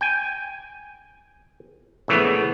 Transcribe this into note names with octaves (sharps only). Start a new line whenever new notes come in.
G5 G#5
A#1 C#3 E3 A3 B3